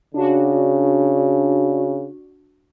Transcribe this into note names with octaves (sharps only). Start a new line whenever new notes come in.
C#3 D4 F#4